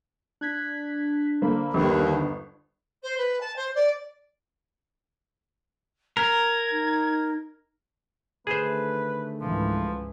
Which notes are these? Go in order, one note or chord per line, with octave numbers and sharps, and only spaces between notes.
D4 F#6 G#6 B6
D3 A#3 C5 B5
G1 D#2
C5
B4
A5
C5
D5
A#4 G#6
D#4
D3 D#3 A3 G#4 B4 C5
C#2 G#2 E3 F3